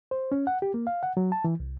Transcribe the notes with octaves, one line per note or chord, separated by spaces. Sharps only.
C5
C#4
F#5
G4
A#3
F5
F#5
F#3
A5
E3
C2